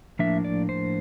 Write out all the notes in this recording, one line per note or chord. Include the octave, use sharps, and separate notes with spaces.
A2 F3 A#3 D4 E5
D5
C5